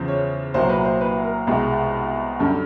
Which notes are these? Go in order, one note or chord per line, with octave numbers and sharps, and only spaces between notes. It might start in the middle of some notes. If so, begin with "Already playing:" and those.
Already playing: E2 C#3 F3
C#5
C2 A#2 F#3 A#3 C5
B4
C5
B4
A#4
C2 B2 G#3
F#2 D3 G3 A4